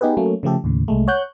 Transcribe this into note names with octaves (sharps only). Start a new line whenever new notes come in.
B3 D#4 G4 G#4 B4
F#3 A3 A#3 C#4
C#3 F3 A3 G4 A4
D#2 A2 C#3
C2 G#3 A3
C#5 F#5 F#6 G6